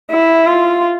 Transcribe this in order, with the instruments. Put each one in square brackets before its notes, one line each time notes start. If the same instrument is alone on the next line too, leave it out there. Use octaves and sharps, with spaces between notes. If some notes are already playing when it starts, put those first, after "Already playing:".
[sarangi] E4
F4